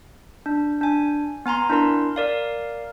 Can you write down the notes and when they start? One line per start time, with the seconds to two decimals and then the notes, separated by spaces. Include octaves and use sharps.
0.46 D4
0.81 D4 G#5
1.46 B3 G#5 A#5 C6
1.70 D4 E4 A#4 C6
2.16 A#4 D5 F5